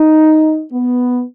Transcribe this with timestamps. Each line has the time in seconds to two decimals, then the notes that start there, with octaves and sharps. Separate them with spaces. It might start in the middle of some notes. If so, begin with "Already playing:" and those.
Already playing: D#4
0.73 B3